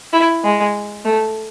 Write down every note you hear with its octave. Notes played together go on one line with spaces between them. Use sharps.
E4
G#3
A3